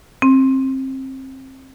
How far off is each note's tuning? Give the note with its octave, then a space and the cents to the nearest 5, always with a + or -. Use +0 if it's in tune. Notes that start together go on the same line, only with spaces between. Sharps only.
C4 +25